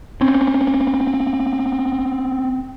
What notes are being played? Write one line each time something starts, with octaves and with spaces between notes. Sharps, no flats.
C4 C#4